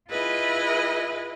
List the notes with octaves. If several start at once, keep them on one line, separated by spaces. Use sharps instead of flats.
E4 F4 G#4 B4 D#5